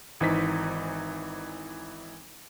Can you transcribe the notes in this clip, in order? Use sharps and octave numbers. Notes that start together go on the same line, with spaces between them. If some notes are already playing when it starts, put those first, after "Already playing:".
G#1 E3 D#4 C5 B6